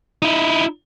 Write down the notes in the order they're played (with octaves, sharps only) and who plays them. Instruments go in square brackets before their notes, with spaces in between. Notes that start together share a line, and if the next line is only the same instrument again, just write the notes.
[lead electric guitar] D#4 E4